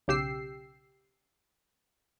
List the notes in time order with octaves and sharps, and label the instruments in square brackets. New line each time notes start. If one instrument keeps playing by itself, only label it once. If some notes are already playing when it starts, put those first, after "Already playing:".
[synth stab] B1 C#3 G4 G5 E6 C7